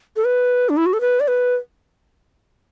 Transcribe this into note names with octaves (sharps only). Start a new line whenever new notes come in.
A4
B4
D4
E4
F#4
A4
B4
D5
B4